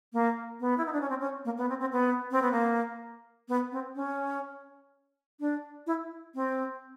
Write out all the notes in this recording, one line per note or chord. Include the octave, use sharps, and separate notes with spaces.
A#3
B3
E4
D#4
D4
C#4
C4
C#4
A#3
B3
C4
C4
B3
C4
B3
A#3
B3
C4
C#4
D4
E4
C4